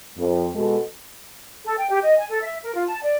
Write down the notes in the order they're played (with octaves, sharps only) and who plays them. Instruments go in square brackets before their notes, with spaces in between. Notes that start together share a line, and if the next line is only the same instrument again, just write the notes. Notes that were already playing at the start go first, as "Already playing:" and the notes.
[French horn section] F2
B2 G#3 F#4 A4
[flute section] A4
G5
G4
D#5
G#5
A4
E5
A#4
F4
A5
D5